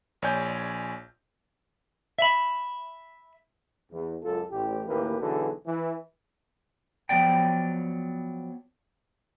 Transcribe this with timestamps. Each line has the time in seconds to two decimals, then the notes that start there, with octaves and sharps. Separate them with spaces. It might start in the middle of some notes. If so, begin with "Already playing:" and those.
0.22 A#1 C#5 D5 G#5 G6
2.19 E5 B5
3.91 E2
4.22 C#2 F#2 F4 A4
4.51 A1 G4
4.87 A1 D#2 E3 A#3 G4 B4
5.20 B1 D3 E3 F#4 G#4 A4
5.66 E3
7.09 F3 F#3 B3 D5 G5